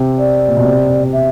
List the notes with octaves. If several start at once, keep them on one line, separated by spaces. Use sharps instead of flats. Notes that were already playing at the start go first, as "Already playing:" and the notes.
Already playing: C3
D5
A#2
B2
C3
C3
E5